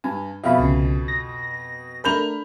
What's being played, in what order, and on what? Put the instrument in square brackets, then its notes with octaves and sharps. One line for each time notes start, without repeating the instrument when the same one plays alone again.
[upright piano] G2 [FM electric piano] G#5
[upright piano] F2 B2 [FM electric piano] E5 F5 B5
[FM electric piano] C2 C#3
A#6
[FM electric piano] A3 D4 A#4 [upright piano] B5 G6 F7